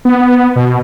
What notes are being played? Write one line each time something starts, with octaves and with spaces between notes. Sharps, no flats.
B3
B2